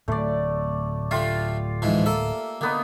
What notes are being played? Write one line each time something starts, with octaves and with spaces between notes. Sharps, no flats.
D1 A2 A3 D5
D3 A3 F4 G4
G#2 E3 F3
A#3 A4 E5
D3 A#3 B3 D#4